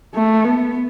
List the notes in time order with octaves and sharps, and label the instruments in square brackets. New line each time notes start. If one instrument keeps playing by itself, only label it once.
[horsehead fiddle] A3
B3